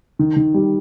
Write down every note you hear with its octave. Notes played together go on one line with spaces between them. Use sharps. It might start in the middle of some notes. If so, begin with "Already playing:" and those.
D#3
D#3
G3